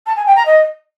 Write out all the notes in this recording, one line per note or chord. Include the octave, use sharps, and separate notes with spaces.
A5
G#5
G5
A#5
D#5